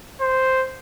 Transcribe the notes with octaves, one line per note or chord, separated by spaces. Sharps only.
C5